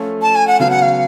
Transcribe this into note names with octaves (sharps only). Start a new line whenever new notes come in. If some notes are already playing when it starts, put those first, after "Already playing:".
Already playing: F3 A3 C#4 F4 A4
A5
G#5
F#5
C#3 F#3 B3 F5
F#5
F5